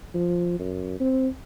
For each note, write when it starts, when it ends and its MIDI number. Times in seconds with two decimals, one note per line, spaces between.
0.14 0.55 53
0.59 0.95 42
1.00 1.28 60